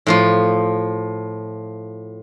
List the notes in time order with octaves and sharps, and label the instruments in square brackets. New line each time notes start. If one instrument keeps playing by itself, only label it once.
[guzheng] A2 F3 F4